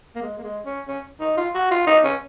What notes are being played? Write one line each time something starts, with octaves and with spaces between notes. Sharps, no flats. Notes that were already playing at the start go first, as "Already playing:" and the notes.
A#3
G#3
A#3
G#3
C#4
C#4
D#4
F4
F#4
F4
D#4
C#4